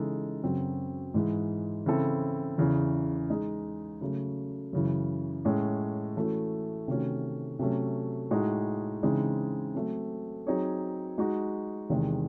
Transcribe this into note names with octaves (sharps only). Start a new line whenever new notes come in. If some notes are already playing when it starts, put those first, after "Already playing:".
Already playing: C#3 E3 G#3 D#4 A4
F#2 C#3 F#3 C4 F#4
G#2 E3 G#3
C#3 E3 C4 E4 A4
E2 C#3 E3
G#3 D#4 G#4 D#5
C#3 F#3 A3
F#2 C#3 E3
A2 G#3 C#4
E3 A3 C#4 F#4 A4
C3 D#3 A3 C#4 F#4
C3 F#3 A3 C#4
A2 G#3 D#4 F#4
C#3 E3 G#3 C4 D#4
F#3 A3 C4
F#3 C4 D#4 G#4 C#5
G#3 D#4 F#4
E2 C3 D#3 G#3